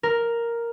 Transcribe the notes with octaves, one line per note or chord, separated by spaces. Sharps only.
A#4